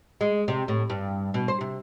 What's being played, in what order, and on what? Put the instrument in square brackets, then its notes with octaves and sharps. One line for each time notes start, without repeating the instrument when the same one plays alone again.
[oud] G#3
C3
A2
G2
B2
C5
C3